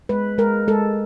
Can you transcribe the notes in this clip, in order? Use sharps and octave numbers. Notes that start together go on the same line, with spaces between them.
G#3 B4
G#3 A#4
G#3 A4